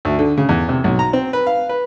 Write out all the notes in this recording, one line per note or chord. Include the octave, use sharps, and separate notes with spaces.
D2
D3
C#3
E2
C3
B1
A#5
C4
B4
F5
B4